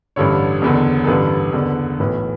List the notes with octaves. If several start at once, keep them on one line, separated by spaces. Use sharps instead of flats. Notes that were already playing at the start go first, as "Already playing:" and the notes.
A1 G2 D3 C#5
F#1 E2 D3
A4
A1 G2 D3 B4
F#1 E2 D3
B1 A2 E3 B4